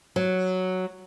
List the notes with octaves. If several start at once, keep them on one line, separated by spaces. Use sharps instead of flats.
F#3